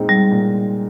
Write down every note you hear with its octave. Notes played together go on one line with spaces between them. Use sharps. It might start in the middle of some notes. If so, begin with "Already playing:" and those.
Already playing: A#2 G#3 C4 D#4
G3
A#2